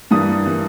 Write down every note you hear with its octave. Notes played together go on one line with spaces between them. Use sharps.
G2 E3 G3 A#3 D#6
E3 G3 A#3